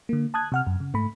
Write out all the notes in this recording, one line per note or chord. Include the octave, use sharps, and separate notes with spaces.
D3 A#3
A5 D#6 F#6 G#6
C3 F#5 F6
F#2
C#3
G#2 A3 B5